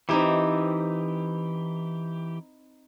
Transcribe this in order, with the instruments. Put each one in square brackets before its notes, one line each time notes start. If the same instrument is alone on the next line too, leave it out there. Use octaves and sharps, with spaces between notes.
[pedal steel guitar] E3 G4 [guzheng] C4 D#4 E4